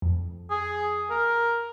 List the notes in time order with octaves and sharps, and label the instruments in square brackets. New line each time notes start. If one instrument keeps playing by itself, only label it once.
[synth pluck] F2
[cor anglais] G#4
A#4